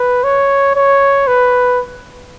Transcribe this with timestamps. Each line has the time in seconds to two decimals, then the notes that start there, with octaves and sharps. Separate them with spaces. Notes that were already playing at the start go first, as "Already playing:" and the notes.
Already playing: B4
0.24 C#5
0.76 C#5
1.27 B4